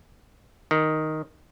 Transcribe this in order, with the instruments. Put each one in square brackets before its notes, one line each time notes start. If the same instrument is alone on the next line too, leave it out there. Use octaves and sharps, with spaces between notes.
[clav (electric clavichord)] D#3